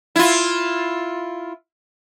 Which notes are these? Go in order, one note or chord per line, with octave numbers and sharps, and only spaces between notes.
E4 F4